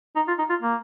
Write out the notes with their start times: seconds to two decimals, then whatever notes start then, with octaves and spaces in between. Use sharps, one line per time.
0.16 D#4
0.28 F4
0.38 D#4
0.49 F4
0.62 A#3